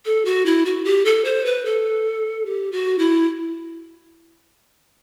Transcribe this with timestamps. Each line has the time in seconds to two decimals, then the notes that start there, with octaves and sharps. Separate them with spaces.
0.05 A4
0.25 F#4
0.46 E4
0.65 F#4
0.85 G4
1.05 A4
1.25 C5
1.45 B4
1.65 A4
2.46 G4
2.72 F#4
2.99 E4